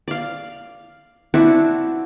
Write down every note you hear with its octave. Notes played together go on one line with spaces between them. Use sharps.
D5 F5
C4 D4 E4 F#4